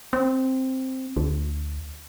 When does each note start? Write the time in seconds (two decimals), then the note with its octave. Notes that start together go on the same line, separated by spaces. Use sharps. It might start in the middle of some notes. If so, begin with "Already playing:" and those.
0.13 C4
1.16 D2